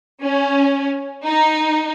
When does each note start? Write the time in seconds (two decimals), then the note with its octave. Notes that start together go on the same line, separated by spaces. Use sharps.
0.23 C#4
1.27 D#4